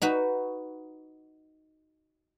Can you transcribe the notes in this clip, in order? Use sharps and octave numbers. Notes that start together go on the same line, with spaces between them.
D#4 F#4 B4